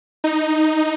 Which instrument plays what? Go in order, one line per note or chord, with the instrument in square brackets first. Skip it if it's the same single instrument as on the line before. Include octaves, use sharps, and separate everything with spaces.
[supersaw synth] D#4